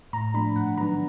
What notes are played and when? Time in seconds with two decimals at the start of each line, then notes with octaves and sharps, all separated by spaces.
0.13 A2 A#5
0.34 F3 A3 D4 B5
0.56 G#2 F#5
0.77 D#3 F#3 B3 D4 A#5